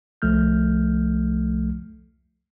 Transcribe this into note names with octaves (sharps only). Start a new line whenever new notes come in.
C2 F3 A3 F6 G6